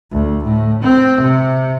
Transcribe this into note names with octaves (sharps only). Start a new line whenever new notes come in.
D2
A2
C4
C3